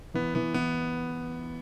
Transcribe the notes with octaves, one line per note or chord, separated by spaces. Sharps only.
E3 B3
E3 B3
E3 B3